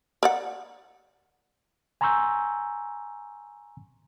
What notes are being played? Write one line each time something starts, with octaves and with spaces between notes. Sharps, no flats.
A#4 D5 F#5
G#5 A#5 C6 C#6 E6 G6